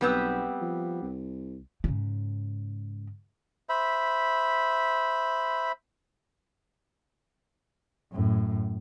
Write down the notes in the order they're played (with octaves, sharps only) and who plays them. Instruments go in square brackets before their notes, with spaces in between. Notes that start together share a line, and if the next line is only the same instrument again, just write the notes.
[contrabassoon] B1 [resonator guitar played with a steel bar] G3 B3 C4
[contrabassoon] F3
C2
[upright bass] G#2 C#3
[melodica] C5 E5 B5
[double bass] F#2 A2